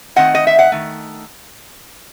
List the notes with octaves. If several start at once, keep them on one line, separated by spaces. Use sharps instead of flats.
D#3 A3 C4 D#5 F#5
D#5
E5
F#5
D#3 A3